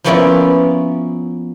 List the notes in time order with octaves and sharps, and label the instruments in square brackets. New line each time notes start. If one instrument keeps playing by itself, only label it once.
[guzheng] F3 A#3 B3 C#4 E4 D5